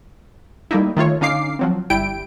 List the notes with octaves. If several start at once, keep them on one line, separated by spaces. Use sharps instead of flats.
G3 A3 A#3 D#4 E4
D#3 A3 F4 C#5
D3 C#4 D#4 F5 D6 C7
F3 F#3 C4
G1 G3 E4 G5 D7